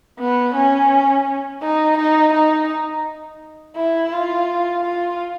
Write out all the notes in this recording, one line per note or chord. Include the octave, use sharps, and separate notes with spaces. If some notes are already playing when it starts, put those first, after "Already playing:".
B3
C#4
D#4
D#4
D#4
E4
F4
F4